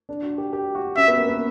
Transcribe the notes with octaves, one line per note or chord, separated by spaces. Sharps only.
D4
F#4
G4
G4
F#4
C#4 E5
B3
A#3
B3